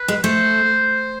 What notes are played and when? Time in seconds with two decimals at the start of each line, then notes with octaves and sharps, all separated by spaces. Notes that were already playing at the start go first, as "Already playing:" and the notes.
Already playing: B4
0.08 G#3
0.24 A3 C5